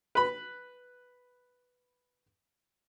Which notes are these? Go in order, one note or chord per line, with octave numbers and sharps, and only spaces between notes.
B4 B5